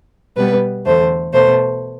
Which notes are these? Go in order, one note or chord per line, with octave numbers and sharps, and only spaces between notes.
B2 G3 B3 B4
E2 D3 A3 C5
B2 A3 C5